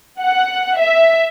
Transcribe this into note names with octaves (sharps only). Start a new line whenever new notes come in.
F#5
E5